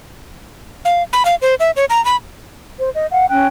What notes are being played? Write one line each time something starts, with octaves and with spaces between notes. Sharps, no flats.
F5
B5
F5
C5
E5
C#5
A#5
B5
C5
D#5
F5 F#5
C#4 G5 F#6